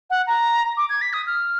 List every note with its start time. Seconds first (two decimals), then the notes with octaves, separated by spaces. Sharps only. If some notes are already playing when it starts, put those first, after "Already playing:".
0.10 F#5
0.27 A#5
0.77 D6
0.90 G#6
1.01 B6
1.13 D#6
1.27 F6